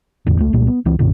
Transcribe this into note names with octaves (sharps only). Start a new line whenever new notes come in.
E1 E2 A2 D3
C#2 A3
C2 A#2 G3 A3
B3
C#2 E3 C4
B1 F#2 A#2 D3